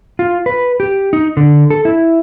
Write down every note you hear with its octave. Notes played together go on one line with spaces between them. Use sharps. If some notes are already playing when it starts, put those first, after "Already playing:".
F4
B4
G4
D#4
D3
A4
E4